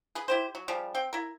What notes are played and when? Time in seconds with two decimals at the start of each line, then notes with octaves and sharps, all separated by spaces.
0.15 G#4 B4
0.28 E4 G4 C5
0.55 F#3
0.68 C#3 F3 G3
0.94 C4 G5
1.13 E4 A#4